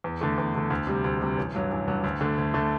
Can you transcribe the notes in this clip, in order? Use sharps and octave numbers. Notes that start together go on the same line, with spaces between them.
E2
D3 A3
E2
D3 A3
D2
C3 G3
D2
C3 G3
A1
G2 F#3
A1
G2 F#3
D2
D3 A3
D2
D3 A3